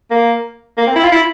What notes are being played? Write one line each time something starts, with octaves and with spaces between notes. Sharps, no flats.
A#3
A#3
C4
E4
F4
E4